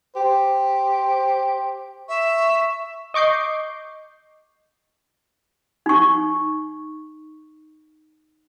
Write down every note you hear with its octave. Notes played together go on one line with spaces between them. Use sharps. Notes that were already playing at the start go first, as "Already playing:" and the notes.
G4 C5
E5 C#6
D#5 C#6 D6 G6 C7
D#4 C#6